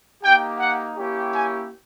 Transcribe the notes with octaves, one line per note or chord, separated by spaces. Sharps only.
A#3 D#4 G4 G5
F#5
A#3 C#4 E4 G4
G#5